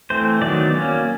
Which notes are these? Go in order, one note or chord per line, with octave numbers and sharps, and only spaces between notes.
E3 A3 C4 C5
D#3 F#3 B3 D5
F#3 A#3 C#4